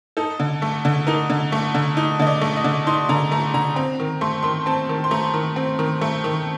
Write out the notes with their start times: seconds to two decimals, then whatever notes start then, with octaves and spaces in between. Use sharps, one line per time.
0.17 D#4 A4
0.40 D3
0.62 A3
0.85 D3
1.07 D#4 A#4
1.30 D3
1.52 A3
1.75 D3
1.97 D#4
2.20 D3 D#5
2.27 D5
2.41 A3
2.57 D#5
2.64 D3
2.87 D#4 C6
3.09 D3 A#5
3.31 A3 A#5
3.54 D3 A#5
3.76 C4 A#5
4.00 D#3
4.21 A3 C6
4.43 D#3 C6
4.66 C4 A5
4.89 D#3
5.04 C6
5.11 A3 A#5
5.34 D#3
5.56 C4
5.79 D#3
6.01 A3
6.24 D#3